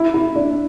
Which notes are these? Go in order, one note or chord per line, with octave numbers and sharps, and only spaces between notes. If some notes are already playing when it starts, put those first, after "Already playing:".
Already playing: E4
E4
D4